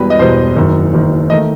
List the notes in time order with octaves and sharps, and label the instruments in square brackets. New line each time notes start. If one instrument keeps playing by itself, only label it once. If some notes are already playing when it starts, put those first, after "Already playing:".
Already playing: [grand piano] E1 E2 B2 G3 B4
D#5
E1 E2 B2 G3 C5
F#1 F#2 D#3
F#1 F#2 D#3
D#3 A3 D#5